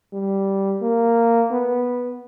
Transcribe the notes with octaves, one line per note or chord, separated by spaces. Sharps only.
G3
A#3
B3